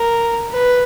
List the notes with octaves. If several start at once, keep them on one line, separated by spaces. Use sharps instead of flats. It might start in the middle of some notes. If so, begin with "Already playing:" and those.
Already playing: A#4
B4